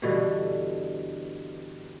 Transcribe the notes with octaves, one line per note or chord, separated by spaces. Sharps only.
G2 B2 D3 E3